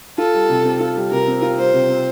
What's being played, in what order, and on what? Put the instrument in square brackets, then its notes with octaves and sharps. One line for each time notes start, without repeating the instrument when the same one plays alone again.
[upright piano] F4 [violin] A4
[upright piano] G3
C3
C4
F4
G3
[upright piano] C3 [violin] A#4
[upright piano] C4
F4
[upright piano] G3 [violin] C5
[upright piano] C3
C4